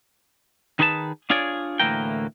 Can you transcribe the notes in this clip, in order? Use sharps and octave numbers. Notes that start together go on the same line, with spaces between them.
D#3 D#4 G#4 B4 G#5 A5
D4 F4 G#4 C#5 D5
D2 A2 E3 A#3 A#4 G5